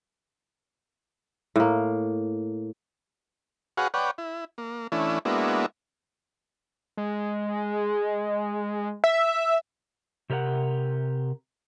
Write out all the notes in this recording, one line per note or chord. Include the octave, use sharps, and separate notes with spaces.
A2 A#3
F#4 G#4 B4 C#5 F5 F#5
B4 C#5 D5 F#5 G5
E4
A#3
E3 A3 C#4 D4 E4
G#3 A#3 B3 D4 E4 F#4
G#3
E5
C3 G4 A#4 C#5 F#5